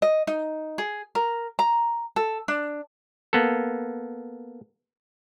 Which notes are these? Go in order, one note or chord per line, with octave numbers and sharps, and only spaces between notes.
D#5
D#4
G#4
A#4
A#5
A4
D4
A#3 B3 A4